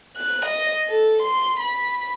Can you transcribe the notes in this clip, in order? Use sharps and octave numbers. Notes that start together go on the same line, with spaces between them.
F#6
D#5
A4
C6
B5